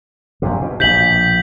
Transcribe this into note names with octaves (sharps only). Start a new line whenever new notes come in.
A#1 F#2 C3
B2
A#1 B2 G6 B6 F#7